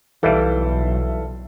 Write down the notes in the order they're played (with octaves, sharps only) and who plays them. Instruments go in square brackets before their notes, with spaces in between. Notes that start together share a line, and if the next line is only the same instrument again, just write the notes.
[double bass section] B1 [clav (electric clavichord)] E3 G3 [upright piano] A4 E5 F5